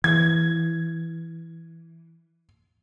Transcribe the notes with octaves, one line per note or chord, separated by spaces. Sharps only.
E3 G#6